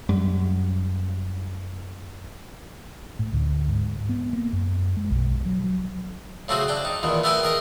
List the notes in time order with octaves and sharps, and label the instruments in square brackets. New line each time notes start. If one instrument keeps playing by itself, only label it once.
[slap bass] F#2 G3
[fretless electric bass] A2
D2
G#2
B3
A#3
F#2
G#3
B1
F#3
F#3
[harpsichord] C#3 A3 C4 F#4 G#4
D4 G5
D#4
E2 A#2 D#3
A3 B3 A#4 E5 G5 G#5
G#4 A#4 D#5